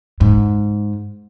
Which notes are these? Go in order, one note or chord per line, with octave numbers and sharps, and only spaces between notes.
G#2